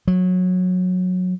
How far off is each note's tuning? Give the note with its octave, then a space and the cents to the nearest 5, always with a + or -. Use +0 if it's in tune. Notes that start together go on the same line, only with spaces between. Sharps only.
F#3 -20